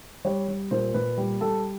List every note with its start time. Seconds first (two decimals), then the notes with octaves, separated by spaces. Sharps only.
0.25 G3 C#5
0.48 G3
0.71 A#2 C5
0.94 A#2 B4
1.18 G3
1.41 G3 A4